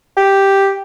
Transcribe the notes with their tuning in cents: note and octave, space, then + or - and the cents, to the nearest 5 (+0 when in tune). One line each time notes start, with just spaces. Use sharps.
G4 +0